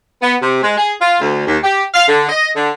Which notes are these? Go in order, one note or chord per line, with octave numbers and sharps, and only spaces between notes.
B3
C3
G#3
G#4
F4
D2
D#2
G4
F5
D3
D#5
D3